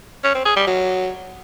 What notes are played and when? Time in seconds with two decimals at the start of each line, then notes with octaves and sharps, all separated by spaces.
0.24 C#4
0.35 C4
0.45 G#4
0.56 G3
0.67 F#3